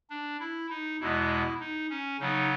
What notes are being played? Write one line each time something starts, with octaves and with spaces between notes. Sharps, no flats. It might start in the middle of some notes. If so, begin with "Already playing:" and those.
D4
E4
D#4
E2 B2 G#3 B3 E4
D#4
C#4
C#3 F#3 B3 D#4